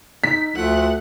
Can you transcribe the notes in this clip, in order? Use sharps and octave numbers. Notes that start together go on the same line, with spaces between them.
D#4 B6
D2 F3 A3 F#5